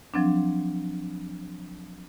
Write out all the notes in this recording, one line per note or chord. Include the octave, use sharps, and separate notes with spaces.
F3 F#3 C4 D4